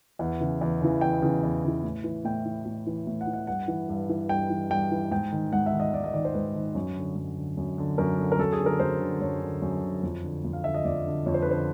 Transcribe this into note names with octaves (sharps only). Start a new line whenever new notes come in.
E2 F#5
C#3 E3
E2
C#3 E3
E2 G5
C#3 E3
E2
C#3 E3
A2
E3
A2 G5
E3
A2
E3
A2
F#5
E3
F#5
G2 F#5
E3
G2
E3
G2 G5
E3
G2 G5
E3
G#2 G5
D#3
G#2 F#5
E5
D#3
D#5
G#2 D5
D#5
D#3 D5
C5
G#2 B4
D#3
F#2
D3
F#2
D3
F#2
D3
F#2 A#4
D3
A#4
F#2 A4
G#4
D3
A#4
F#2 C5
D3
F#2 C#5
D3
F#2
D3
F2
D3
F2
F5
D3 E5
D#5
F2 D5
D3
F2 C#5
C5
B4
D3 C5